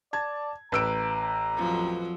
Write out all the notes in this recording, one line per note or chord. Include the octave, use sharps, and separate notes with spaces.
D5 A5 G#6
A1 B4 A#5 E6 D7
F2 F3 F#3